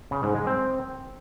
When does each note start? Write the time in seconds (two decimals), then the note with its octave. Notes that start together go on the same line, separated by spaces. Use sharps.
0.11 C#3
0.23 G#2
0.35 G#3
0.47 C4